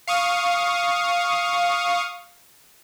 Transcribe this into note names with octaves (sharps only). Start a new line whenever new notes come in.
F5 C#6 D#6